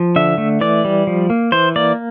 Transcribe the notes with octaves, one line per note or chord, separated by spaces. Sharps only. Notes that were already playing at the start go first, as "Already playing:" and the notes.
Already playing: F3
D3 E5
A3
E3 D5
G3
F3
A#3
E3 C5
A#3 D5